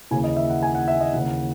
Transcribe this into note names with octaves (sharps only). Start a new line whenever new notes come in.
D#2 C#3 E3 G#5
D#5
E5
F#5
G#5
F#5
E5
D#5
D#2 C#3 E3 F#5